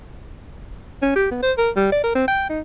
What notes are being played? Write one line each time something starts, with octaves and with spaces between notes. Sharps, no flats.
C#4
G4
B3
C5
A#4
G3
D5
A#4
C4
G5
D#4